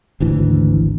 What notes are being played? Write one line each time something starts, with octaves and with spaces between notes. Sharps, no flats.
G#1 D2 E3